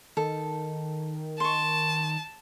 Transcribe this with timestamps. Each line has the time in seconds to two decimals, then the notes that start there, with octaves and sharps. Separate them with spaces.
0.17 D#3 A4
1.40 A5 C6 C#6